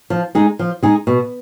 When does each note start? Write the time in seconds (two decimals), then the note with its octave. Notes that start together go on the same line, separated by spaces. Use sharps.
0.10 F3
0.35 G#3 D#4 G#4
0.59 F3
0.83 G#3 D#4 G#4
1.07 B2